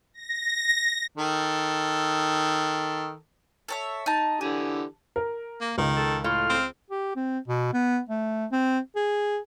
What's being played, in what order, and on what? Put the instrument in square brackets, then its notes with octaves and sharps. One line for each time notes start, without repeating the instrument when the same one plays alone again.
[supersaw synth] A#6
[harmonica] D#3 A4
[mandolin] A4 C#5 E5
D#4 A5
[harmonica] D3 E3 G4 [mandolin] G#4
[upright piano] A#4
[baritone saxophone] A#3
[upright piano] C#2 [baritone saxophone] D#3
[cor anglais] A4
[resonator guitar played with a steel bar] A2 F4 [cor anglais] F5
[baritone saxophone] C4
[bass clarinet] G4
C4
B2
B3
A3
C4
G#4